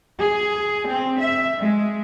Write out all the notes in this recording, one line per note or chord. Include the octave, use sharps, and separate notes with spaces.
G#4
C4
E5
G#3